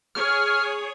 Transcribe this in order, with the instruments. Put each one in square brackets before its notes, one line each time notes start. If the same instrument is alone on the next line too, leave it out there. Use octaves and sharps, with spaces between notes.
[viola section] G#4 C#5 [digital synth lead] F6